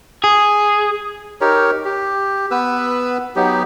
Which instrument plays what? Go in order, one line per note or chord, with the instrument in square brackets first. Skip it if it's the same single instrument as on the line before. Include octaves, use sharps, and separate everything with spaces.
[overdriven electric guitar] G#4
[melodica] D#4 G4 A#4 C#5
G4
B3 B4 E6
F#3 B3 D#4 G4